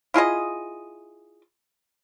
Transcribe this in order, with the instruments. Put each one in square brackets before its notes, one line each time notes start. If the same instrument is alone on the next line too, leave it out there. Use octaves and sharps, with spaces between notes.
[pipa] E4 F4 G#4 D#5